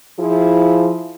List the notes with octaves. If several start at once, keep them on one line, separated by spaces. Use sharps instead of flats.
F3 E4 G#4